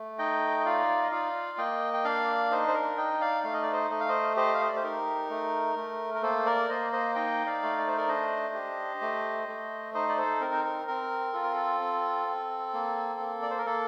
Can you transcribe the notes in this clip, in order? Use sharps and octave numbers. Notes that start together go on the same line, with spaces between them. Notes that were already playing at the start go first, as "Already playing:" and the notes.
Already playing: A3
D#4 D#5 G5
D#5
F4 D5 F5
D#5
F4 D5 F5
A#3 D#5 G5
G5
D4 D5 F5
D#4 C5 D#5
C5
A#4
D#4 D#5 G5
D5 F5
A3 F5
D#5
D5
C5 D#5
A3 D#5
F5
C5 D#5
G4 C5 D#5
F5
D#5
D5
C5
D#4 A#4
A3
A3
A#4
A#3 A4 C5
A#4 D5
A#3 C5 D#5
C5 D#5
D#4 D#5 G5
D5 F5
A3
D5
C5
A#4 D5
D4 C5 D#5
G4
A3
A3
D#4 C5 D#5
D5
A4 C5
C4 A#4
C5
A#4
C4 A#4
F4 A4
A#4
A4
C4
C4
A#3
A#3
D5
C5
A#4
A#3 A4